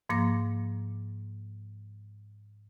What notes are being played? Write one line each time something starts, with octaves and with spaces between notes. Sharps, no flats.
G#2 F3 A#3 D6 A#6